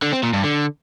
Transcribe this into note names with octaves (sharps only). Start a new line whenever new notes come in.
D3
C4
A#2
G2
D3